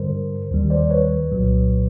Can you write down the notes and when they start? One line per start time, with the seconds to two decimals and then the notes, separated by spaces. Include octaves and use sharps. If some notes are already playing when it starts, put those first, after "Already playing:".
Already playing: G2 D3 G3 A#4 C5
0.51 D#2 D#3 G3
0.70 C5 D5
0.90 B4 C#5
1.32 C2 A#2 F#3